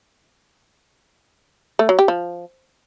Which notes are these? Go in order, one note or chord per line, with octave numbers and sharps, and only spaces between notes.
A3
F#3
G4
F3